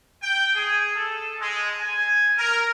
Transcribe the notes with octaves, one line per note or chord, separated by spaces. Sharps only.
G5
G#4
A4
G#3
G#5
A#4